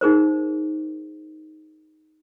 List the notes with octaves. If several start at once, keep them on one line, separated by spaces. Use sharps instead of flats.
D#4 G#4 A#4 C5